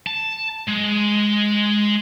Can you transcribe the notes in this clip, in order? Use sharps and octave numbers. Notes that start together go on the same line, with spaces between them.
A5
G#3